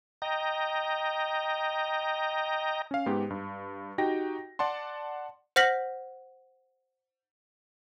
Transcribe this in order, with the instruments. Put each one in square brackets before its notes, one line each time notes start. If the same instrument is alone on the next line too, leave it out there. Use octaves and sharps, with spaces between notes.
[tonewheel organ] D#5 G5 A#5
[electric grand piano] C#4 F5
G#2 B3 G4
G2
D#4 F#4 G4 G5 A#6
D5 F#5 A5 C6
[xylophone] C5 F#5 F6 A#6 B6 F#7